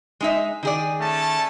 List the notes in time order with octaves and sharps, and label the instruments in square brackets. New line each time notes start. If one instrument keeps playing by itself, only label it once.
[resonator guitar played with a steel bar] G#3 D#4 E5
D#3 G#4 D5
[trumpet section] A3 C#4 A5